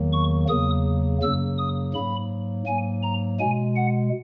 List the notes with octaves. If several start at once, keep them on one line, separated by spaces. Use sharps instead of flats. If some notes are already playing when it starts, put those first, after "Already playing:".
Already playing: E2 D#3 F#3 A#3
C#6
E2 C#3 F#3 A#3 D#6
F#2 C#3 F#3 A#3 E6
D#6
G#2 F#3 A#3 B5
G#2 F#3 A#3 G#5
A#5
B2 G#3 G#5
F#5